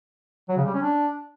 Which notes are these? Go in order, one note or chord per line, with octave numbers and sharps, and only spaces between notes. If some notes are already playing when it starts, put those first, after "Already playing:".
F#3
C#3
G3
C#4
D4